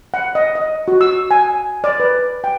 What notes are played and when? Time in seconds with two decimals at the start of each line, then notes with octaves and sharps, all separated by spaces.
0.14 F#5
0.35 D#5
0.55 D#5
0.88 F#4
1.01 E6
1.31 G#5
1.84 D5
2.00 B4
2.44 G5